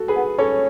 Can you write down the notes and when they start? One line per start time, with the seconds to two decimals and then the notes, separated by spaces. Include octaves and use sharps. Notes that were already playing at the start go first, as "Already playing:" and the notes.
Already playing: F#4 A4
0.08 G#4 B4
0.15 B3
0.38 C#4 A4 C#5